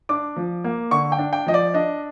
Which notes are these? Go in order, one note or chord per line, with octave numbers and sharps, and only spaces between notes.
D4 D6
F3
A#3
D3 C#6
G5
D4
G5
F3 D#5
D5
D4 D#5